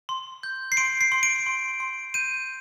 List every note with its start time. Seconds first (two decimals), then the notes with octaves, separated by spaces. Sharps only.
0.09 C6
0.43 G6
0.72 C7
0.77 C6 D7
1.01 C7
1.12 C6
1.23 D7
1.46 C6
1.80 C6
2.14 G6 D#7